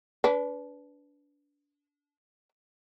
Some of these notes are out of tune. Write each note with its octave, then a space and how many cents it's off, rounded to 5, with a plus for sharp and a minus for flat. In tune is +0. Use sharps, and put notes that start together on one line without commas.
D4 -25 B4 +0